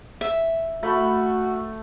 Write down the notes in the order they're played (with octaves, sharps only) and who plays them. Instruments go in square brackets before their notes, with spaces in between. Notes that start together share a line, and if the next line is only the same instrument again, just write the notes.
[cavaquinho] E5
[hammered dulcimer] A3 B5 [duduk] F#4